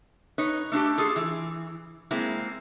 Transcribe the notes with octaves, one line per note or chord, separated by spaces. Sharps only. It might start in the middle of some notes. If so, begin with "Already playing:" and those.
D#4 B4 C#5
A3 D4 F#4 G4
F4 G#4 A4
E3
G#3 A#3 C4 E4